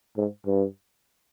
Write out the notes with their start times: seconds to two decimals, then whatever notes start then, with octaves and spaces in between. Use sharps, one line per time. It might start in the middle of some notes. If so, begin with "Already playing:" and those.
0.17 G#2
0.47 G2